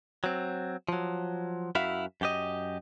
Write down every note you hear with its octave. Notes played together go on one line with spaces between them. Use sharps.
F#3 C4
F3 F#3
F#2 E4 F#4 E5 F5
F#2 G4 D#5